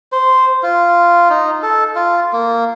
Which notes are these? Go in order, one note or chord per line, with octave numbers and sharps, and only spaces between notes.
C5
F4
D#4
A4
F4
A#3